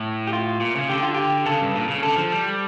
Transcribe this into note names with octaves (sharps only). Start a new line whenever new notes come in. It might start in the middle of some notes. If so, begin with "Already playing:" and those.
Already playing: A2
G4
F4
A#2
C#3
D3 G4
F4
G4
C#3 A4
G2
A#2
C#3
D3 A4
F3
G3